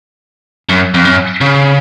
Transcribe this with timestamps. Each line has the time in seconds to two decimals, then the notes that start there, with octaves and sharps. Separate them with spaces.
0.69 F#2
0.94 F2
1.05 F#2
1.41 C#3